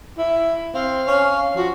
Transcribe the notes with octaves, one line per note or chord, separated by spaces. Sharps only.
E4
C4 F5
C#4
F3 F#4